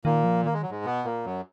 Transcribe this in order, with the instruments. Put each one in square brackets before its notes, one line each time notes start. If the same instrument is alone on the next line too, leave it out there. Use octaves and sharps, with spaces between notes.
[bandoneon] A#2 A#3 [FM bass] D#3
[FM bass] F3
[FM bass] D#3 [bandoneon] A#3
[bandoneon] G#3
F#3
G#2 G#3
B2 B3
A#2 A#3
F#2 F#3